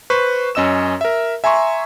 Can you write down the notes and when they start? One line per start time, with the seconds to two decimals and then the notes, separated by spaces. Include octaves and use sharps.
0.10 B4 C5 C#6
0.55 F#2 C#4 D#5 E6 E7
1.01 A#4 E5
1.44 E5 G#5 A#5 C6 C#6